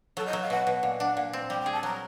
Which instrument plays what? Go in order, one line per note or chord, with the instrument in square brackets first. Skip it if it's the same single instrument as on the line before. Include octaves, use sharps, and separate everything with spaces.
[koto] F#3 [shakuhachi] A4
[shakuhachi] D#5
[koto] F#3
[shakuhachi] F5
[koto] B2 [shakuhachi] F#5
[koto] B2
A#2
D4
A#2
C4
[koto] G3 [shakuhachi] G5
[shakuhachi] G5
[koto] G#4
[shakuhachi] A5
[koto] F#3 [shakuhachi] A#5